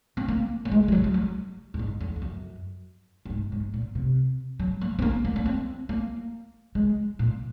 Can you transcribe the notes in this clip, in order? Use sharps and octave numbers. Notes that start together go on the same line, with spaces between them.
C4
A#3
A#3
G#3
G#3
F#3
G#3
F#3
F#2
G#2
F2
F2
F#2
F#2
G#2
G#2
A#2
C3
F#3
A#3
C4
A#3
A#3
A#3
C4
A#3
G#3
A#2